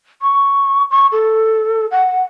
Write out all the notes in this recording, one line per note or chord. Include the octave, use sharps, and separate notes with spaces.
C#6
C#6
A4
F#5